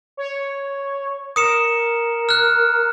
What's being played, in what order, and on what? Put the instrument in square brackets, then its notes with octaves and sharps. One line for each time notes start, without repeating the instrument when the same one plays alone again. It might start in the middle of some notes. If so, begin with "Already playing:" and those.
[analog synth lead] C#5
[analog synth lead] A#4 [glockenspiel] D#6 C#7 E7
[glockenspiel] F6 F#6